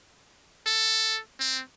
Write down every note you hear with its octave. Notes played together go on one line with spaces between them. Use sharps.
A4
C4